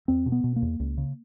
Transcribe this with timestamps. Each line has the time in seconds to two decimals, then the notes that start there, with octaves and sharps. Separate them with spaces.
0.08 E2 C4
0.26 B2
0.32 B3
0.44 B2
0.56 A#3
0.62 E2
0.80 C#2
0.98 C#3